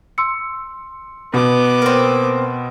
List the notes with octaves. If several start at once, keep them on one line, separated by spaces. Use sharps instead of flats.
C6 E6 C#7
B2 B3 D6
A#3 C4